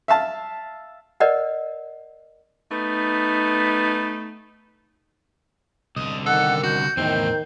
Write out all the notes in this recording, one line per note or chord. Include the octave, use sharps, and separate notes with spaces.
E5 F5 A5
A#4 B4 D5 D#5 F#5
A3 B3 D#4
C2 D3 D#5
D#3 A4 F#5 F#6
F#4 G6
E2 A2 D#3 C4